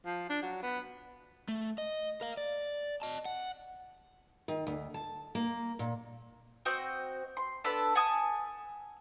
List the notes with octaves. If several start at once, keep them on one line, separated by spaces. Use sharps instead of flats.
F3
D4
F#3
B3
A3
D#5
A#4 F5
D5
D#5 A5
F#5
D#3
D2
A5
A#3
A#2
C4 F#4 D#5 G5
C6
B3 D4 A4 B5
F#5 G#5 A5 D#6